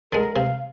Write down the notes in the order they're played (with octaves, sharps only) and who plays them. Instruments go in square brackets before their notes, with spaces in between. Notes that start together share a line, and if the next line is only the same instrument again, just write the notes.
[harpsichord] D3 G#3 [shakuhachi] A#4
[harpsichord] C3 [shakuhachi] F5